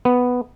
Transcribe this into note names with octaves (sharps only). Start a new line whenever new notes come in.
B3